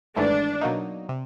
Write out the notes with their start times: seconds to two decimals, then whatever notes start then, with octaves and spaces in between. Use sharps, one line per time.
0.16 G#1 G#2 E3 A3 D4
0.61 B2 F#3 A#3 D#4
1.09 C3